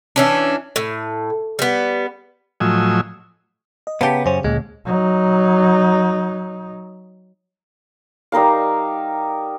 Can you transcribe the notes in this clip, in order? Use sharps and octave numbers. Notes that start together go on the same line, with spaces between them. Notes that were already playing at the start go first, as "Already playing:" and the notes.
E3 C#4 D4
A2
G3 B3
A2 F3 F#3 D#5 G#5 E6
D#5
C#3 B3 G4 G5 A5 A#5
F#2 C#4 C5
D2 A#2 G#3
F#3 D#4
G3 D#4 A#4 F5